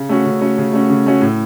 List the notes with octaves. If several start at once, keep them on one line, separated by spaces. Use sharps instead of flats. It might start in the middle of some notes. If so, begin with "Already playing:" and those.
Already playing: C#3
A3 C#4 F#4
C#3
A3 C#4 F#4
C#3
A3 C#4 F#4
C#3
A3 C#4 F#4
A2